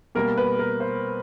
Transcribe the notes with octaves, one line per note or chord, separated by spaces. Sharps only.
B2 G3 A#3 A#4
B4
A#4
C5